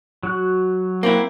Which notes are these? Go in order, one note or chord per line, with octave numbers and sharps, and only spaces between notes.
F#3 F#4 F#6
A#3 C4 E4